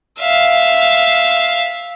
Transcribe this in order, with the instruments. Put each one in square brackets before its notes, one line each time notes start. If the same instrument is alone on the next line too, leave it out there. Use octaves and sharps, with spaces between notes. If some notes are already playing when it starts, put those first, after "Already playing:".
[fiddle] E5 F5